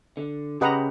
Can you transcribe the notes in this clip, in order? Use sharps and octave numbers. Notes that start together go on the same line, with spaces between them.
D3
C#3 G4 B4 D#5 F#5 A#5